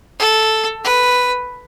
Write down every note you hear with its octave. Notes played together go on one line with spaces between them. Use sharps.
A4
B4